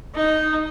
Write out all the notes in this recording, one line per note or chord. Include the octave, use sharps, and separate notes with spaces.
D#4